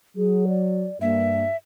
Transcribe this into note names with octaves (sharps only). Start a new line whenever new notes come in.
F#3 G#4
D5
G2 A#3 E5